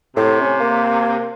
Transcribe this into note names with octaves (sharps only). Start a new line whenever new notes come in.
A2 C3
C#4
A#3